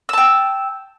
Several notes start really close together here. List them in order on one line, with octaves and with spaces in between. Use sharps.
E6 A5 G5